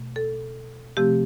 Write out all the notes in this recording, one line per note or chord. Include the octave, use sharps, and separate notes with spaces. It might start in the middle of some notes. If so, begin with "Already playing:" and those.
Already playing: B2 A3
A4
C3 F3 A3 C4 G4